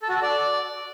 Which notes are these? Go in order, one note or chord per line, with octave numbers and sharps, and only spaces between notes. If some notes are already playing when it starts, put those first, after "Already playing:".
A4
F#4
A4
D5